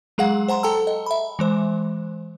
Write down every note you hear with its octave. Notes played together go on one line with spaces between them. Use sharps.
F#3 G#3 G#4 F5 F#5
C5 F#5 A#5 C6
A4 G5 A5 A#5 E6
D#5
E5 B5
E3 G#3 C5